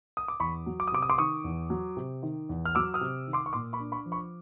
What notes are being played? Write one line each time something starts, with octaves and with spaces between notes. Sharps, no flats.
D#6
D6
E2 B5 C#6
F#3
D6
D#6
C3 D6
D#6
C6 D6
D#3 C#6 D#6
E2
F#3
C3
D#3
E2
F6
F#3 D6 E6
D#6 F6
C3
D#3
C6 D6
C#6
A#2 C6 D6
B5 C#6
D4
B5 C#6
F3
B5 C#6